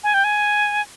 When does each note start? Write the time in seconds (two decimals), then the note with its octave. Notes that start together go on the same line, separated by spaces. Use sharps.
0.04 G#5
0.14 G5
0.24 G#5